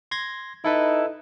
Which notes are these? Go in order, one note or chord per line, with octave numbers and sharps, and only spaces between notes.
C6 G#6 A#6
D#4 E4 A4 B4